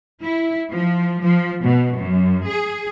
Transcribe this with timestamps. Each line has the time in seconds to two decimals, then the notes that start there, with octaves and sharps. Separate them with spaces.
0.23 E4
0.71 F3
1.21 F3
1.62 B2
1.94 F#2
2.47 G#4